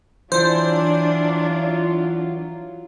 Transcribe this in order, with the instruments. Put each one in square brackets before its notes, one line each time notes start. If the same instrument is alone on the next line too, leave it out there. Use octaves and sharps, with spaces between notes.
[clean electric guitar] E3 [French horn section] F#3 E4 F4 [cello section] D4 [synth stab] C5